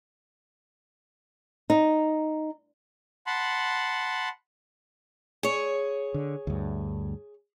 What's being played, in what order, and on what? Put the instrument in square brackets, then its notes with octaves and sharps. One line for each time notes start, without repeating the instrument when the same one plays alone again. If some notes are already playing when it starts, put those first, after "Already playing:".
[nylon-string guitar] D#4
[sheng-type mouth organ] F#5 A5 B5 C6
[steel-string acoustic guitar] G#4 C#5
[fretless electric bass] D3
D2 G2